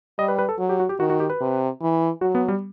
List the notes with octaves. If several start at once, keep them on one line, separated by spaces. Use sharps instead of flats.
G3 D#5
B4
B4
A4
F#3
G4
F#4
G4
D#3 F#4
F#4
G4
B4
C3
E3
F#3 F#4
B3
G3